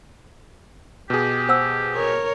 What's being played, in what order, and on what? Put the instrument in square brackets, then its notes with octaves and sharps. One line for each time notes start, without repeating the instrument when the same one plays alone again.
[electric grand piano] B2 G#4 [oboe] G4
[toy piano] C5 F#5 E6
[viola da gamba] A#4 C#5